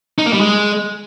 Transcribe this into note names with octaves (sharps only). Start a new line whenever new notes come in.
D#4
A#3
G3
G#3